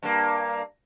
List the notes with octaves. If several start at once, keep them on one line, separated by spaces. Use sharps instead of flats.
G2 A#3